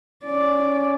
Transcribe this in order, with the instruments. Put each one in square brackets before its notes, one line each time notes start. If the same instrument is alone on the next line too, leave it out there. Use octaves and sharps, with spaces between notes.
[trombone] C#4 [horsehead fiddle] D5